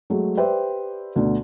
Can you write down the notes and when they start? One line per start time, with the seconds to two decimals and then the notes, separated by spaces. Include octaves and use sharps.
0.10 F#3 G#3 A3
0.37 G4 B4 C5 D5 E5 G5
1.16 D2 B2 D3